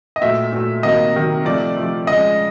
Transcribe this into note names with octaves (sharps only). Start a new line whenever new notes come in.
D#5
A#2 F#3 A3 E5
A#2 F#3 A3
C3 D#3 F#3 A#3 D#5
C3 D#3 F#3 A#3
C3 F3 A3 D5
C3 F3 A3
C#3 F3 G#3 D#5